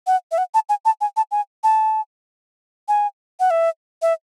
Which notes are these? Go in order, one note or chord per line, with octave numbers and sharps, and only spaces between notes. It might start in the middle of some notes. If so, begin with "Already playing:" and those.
F#5
E5
F#5
A5
G#5
A5
G#5
A5
G#5
A5
G#5
F#5
E5
E5